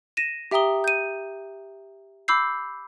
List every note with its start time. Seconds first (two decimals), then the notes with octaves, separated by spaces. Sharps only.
0.17 A#6 D#7 E7
0.51 G4 E5 G5 A#5 D#6 G7
0.84 G6 D#7
2.28 B5 D6 E6 G6 C7